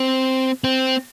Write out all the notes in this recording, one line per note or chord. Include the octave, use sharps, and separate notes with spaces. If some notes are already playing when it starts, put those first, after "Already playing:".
Already playing: C4
C4